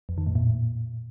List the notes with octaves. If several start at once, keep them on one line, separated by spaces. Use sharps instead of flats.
F2
D#3
A2
A#2